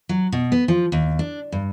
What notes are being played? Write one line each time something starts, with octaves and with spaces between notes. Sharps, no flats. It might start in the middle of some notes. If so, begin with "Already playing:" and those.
F#3
B2
B3
F3
D#2
D4
G2